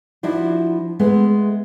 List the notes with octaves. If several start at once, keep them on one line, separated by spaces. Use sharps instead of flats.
F3 D4 E4 F#4
G#3 A3 B3